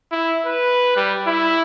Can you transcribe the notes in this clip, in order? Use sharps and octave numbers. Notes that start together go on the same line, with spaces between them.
E4
B4
G3
E4